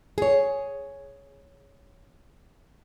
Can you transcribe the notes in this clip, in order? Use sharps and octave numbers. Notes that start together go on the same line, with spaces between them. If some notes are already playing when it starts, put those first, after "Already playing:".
G#4 C#5